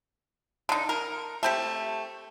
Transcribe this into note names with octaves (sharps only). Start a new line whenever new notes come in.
D3 D#4
A#4
A3 C4 G4